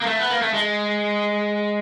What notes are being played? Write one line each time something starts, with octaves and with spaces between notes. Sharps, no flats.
A#3
A3
B3
A#3
A3
G#3